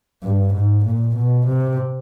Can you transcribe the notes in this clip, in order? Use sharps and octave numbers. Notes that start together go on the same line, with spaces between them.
G2
G#2
A#2
B2
C3